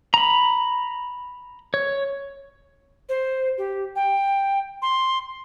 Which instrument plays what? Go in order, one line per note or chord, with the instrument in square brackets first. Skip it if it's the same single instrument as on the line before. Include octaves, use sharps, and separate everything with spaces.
[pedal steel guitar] A#5 B5
C#5
[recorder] C5
G4
G5
C6